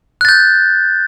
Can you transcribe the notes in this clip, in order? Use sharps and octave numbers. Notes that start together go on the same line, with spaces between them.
F#6 G6 A6